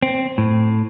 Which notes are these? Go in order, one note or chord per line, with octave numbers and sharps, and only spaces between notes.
C4
A2